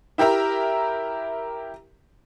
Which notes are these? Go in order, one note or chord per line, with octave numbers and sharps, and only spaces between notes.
E4 G4 A#4 E5 A#5